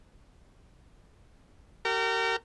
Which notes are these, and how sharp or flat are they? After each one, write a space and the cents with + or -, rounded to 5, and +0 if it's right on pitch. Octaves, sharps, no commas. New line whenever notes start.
G4 -40 A#4 -30